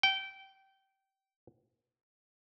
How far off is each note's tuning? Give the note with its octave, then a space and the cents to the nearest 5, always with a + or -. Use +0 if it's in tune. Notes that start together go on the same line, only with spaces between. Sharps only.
G5 -20